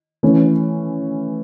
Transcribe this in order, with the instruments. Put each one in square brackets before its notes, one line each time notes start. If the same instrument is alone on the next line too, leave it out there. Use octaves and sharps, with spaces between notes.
[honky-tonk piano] E3 A3 C#4